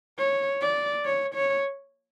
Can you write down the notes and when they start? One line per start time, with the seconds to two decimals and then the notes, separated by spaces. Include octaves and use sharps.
0.18 C#5
0.61 D5
1.05 C#5
1.35 C#5